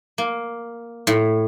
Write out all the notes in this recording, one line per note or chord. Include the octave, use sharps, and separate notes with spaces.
A#3
A2